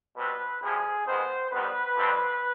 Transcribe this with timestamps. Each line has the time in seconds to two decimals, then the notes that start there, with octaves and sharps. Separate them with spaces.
0.17 B2 G3 C4 B4
0.61 D2 C3 F3 G#4
1.05 F2 D#3 G#3 B3 C5
1.50 F2 D#3 G3 B3 B4
1.96 F2 D3 G3 C4